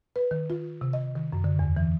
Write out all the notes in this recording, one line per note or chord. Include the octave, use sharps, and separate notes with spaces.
B4
D#3
F4
C3
D#5
D#3
F#2
D3
E2
E3